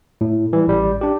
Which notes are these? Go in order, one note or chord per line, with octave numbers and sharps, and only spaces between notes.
A2
E3 G3
A1 G3
D4 G4